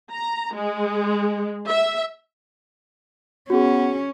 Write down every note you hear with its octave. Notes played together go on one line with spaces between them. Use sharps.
A#5
G#3
E5
B3 C#4 F#4 G#4